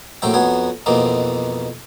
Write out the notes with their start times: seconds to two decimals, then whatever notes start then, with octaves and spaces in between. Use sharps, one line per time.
0.22 A#1 A2 F#3 C4 E5 G5
0.34 F2 F#3 B3 F#5 G#5
0.86 F2 B2 E3 A#3 C4 D#4